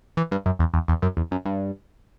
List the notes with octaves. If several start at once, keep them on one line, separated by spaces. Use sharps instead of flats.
E3
G2
F#2
E2
E2
E2
F#2
E2
F#2
G2